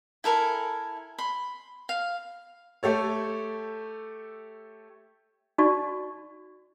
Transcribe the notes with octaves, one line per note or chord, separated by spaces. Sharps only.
E4 A4 A#4 G#5
B5 C6
F5
A3 G4 A4 C#5
D#4 F#4 D5 C#6